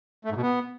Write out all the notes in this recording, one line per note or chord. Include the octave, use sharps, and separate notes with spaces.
A3
G#2
B2
B3